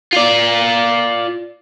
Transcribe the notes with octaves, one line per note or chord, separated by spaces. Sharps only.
F4 D5